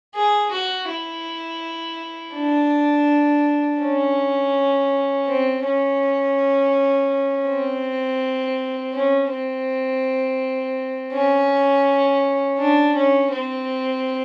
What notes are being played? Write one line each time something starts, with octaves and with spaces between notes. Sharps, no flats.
G#4
F#4
E4
D4
C#4
C4
C#4
C4
C#4
C4
C#4
D4
C#4
C4